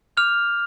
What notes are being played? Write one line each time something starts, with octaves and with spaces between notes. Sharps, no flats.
D6 F6 G6 F7